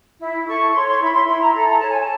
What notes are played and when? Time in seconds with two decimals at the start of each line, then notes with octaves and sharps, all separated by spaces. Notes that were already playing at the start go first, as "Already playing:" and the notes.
0.20 E4
0.47 A4 C#6
0.73 C#5 C6
0.87 C6
1.01 E4 B5
1.14 C6
1.27 E4 B5
1.41 A#5
1.55 A4 A#5
1.68 A#5
1.79 C#5 A5
1.90 G#5
2.00 A5